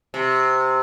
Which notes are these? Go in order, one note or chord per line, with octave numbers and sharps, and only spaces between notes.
C3